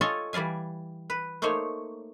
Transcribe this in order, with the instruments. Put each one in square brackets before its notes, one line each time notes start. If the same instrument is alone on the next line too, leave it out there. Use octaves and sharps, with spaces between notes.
[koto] F4 A4 C#5 D#5 G#5 A5
E3 G3 D5 F5 G#5
B4
A3 A#3 D#4 C5 C#5